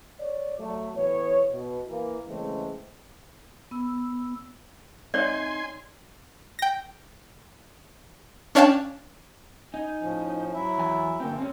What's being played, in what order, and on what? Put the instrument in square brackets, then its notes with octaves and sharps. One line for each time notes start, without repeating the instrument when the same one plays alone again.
[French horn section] C#5 D5
F#3 A3
A2 E3 B3 C#5
B2
E3 A#3
C#3 E3 G#3 A3 C4
[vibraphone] B3 E6
[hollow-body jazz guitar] C4 D#4 E5 [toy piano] C#5 D5 [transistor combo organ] G#5 C6
[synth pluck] G5 A#6
C#4 D4 C#5 F5 G5 A5
[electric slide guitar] D#4 [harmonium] G#5
[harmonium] A2 F3 C#4
F#3 E4 E5
[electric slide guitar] E2 G#5
[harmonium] G2 C#4 G5 [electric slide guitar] D3 A#3 C4
[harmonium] G3 [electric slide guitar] C4 C#4